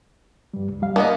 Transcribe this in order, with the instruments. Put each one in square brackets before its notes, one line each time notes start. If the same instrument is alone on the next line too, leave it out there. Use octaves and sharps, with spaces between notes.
[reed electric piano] G2 G3
C#2
G3 F5
[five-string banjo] A#3 B3 D#5